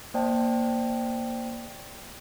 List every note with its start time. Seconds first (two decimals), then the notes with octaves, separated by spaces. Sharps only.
0.14 A#3 C5 D5 G5 A5